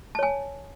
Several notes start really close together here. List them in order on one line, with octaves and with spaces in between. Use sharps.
A5 C#5 G#5